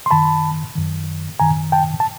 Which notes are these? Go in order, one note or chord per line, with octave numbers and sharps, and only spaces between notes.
C6
F#2 D#3 A5 B5
F#2 D#3
F#2 D#3 G#5 A#5
G5 A5
A5